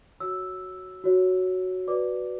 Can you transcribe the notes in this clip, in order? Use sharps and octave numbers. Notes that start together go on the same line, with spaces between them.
F#4 C#5 E6
F#4 C#5
F#4 B4 D5 D6